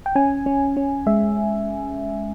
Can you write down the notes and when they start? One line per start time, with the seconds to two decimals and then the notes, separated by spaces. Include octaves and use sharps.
0.06 G5
0.16 C#4 G#5
0.46 C#4
0.77 C#4
1.06 G#3 E5